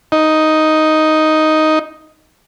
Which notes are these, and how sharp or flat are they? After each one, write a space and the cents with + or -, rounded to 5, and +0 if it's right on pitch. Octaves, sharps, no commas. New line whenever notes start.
D#4 +5